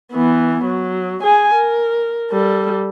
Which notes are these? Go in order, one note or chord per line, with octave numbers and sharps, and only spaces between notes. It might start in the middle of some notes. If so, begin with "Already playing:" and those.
E3 B3
F#3
G#4 G#5
A#4
G3 A4